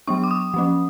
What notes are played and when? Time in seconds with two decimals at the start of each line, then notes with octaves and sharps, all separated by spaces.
0.07 F#3 B3 D4 C#6
0.24 D6
0.31 D#6
0.54 F3 A#3 C#4